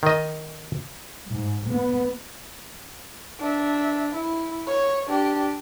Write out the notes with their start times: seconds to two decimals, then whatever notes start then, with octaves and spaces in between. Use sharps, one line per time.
0.03 D#3 D#5
1.31 G#2
1.73 B3
3.40 D4 E5
4.15 E4
4.67 C#5
5.08 D4 G4